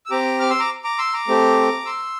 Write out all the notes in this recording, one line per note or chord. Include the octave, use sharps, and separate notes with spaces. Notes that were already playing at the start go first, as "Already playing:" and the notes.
E6
C4 G4 A#5 D6
D6 F6
C6 E6
A#5 D6
A#5 D6
C6 E6
A#5 D6
A3 C4 G4
C6 E6